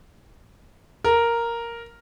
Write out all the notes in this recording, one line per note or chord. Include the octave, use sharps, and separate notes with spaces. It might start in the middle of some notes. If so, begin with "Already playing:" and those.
A#4